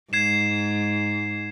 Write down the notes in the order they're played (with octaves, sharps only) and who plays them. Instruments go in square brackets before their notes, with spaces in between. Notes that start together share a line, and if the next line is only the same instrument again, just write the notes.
[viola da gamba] G#2 [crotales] G#6 C7 E7